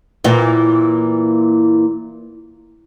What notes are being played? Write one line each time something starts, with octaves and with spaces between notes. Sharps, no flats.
A#2 E3